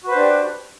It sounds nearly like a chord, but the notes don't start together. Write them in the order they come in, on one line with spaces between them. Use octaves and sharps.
F#4 B4 C5 D4 G4